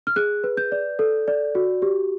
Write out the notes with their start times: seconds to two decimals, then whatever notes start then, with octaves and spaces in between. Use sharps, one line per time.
0.07 F6
0.16 G#4 F#6
0.44 B4
0.57 G6
0.72 D5
0.99 A4
1.28 D5
1.55 F#4
1.82 G4